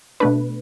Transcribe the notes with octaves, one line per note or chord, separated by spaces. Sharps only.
B2 A3 D4 B4